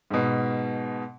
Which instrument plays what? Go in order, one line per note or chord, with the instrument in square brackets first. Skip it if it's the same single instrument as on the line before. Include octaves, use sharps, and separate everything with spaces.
[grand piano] G#2 B2